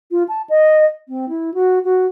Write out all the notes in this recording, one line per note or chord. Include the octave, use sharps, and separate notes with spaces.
F4
A5
D#5
C4
E4
F#4
F#4